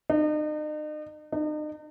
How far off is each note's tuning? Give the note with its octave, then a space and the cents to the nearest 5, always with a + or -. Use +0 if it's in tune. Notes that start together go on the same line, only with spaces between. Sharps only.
D#4 -40
D#4 -40